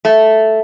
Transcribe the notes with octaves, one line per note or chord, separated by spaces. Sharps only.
A3